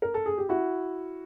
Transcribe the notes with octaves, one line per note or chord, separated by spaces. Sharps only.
A#4
A4
G#4
G4
E4 F#4